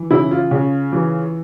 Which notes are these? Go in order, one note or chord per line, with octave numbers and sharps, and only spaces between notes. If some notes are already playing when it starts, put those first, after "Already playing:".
Already playing: E3
C#3 E4
F4
C#3
E3